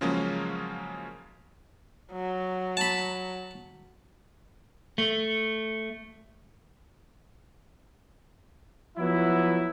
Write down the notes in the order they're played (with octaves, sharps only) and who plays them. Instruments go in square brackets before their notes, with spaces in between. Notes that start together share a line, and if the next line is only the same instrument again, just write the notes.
[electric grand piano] C#3 F3 F#3 G#3 A#3 C#4
[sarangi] F#3
[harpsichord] A5 B5
[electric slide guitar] A3
[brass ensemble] F3 F#3 B3 E4